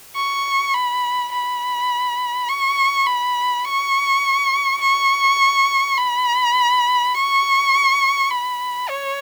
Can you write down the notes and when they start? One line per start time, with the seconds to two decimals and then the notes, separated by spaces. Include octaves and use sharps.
0.15 C#6
0.74 B5
1.32 B5
2.49 C#6
3.07 B5
3.64 C#6
4.81 C#6
5.97 B5
7.14 C#6
8.30 B5
8.89 C#5